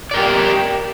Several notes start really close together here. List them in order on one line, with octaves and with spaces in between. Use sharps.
D5 A#4 G4